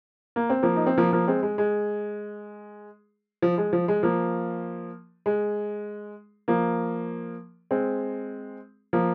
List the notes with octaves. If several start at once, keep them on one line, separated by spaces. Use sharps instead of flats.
A#3
C4
F3 A#3
D#4
C4
F3 A#3
F3 A#3
G#3 C4
G#3
G#3
F3
G#3
F3
G#3
F3 A#3
G#3
F3 A#3
G#3 C4
F3 A#3